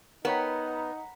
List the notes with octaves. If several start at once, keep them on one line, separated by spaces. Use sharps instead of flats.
B3 D#4 A#4 C#5 F#5 G5 A#5 B5